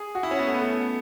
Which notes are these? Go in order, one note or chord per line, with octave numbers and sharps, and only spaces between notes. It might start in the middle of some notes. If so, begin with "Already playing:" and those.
Already playing: G#4
F#4
E4
C#4
B3
A3
B3
A3